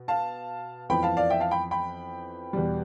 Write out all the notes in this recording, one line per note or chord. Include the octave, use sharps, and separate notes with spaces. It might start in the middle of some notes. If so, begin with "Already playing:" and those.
Already playing: B2
F5 A5
F2 E3 B3 G5 B5
F5 A5
D5 F5
E5 G5
F5 A5
G5 B5
G5 B5
E2 B2 G3